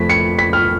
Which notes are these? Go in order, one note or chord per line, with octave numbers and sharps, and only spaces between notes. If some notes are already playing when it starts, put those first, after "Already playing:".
Already playing: F2 F3 A3 B6
C#7
B6
F6